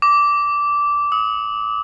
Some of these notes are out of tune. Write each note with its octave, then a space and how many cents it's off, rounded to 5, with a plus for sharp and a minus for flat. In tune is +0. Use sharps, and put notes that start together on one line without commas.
D6 -15
D#6 +40